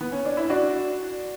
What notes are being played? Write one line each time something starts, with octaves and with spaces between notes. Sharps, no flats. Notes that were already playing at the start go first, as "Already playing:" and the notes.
B3
C#4
D4
E4
D4 F#4